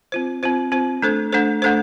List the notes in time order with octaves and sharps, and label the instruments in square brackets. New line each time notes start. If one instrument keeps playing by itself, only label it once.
[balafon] C4 F4 C5
C4 F4 C5
C4 F4 C5
A3 D4 A4 C5
A3 D4 A4 C5
A3 D4 A4 C5